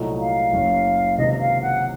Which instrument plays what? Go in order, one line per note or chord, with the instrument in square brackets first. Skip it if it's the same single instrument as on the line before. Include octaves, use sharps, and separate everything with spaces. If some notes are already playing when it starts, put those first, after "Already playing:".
Already playing: [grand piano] C2 A#2 F#3 A3 D#4
[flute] F5
[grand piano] F#1 F#2 C#3
[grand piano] C#2 C3 D#3 [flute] D#5
[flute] D#5
F5
F#5